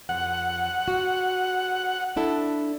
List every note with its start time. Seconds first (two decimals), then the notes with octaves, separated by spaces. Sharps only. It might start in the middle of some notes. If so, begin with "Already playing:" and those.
0.09 F2 F#5
0.88 F#4
2.16 D4 E4 A4